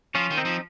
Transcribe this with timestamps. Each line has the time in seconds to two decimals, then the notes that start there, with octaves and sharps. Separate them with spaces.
0.15 F3 C#4 F4
0.30 D#3
0.37 C4 D#4
0.45 F3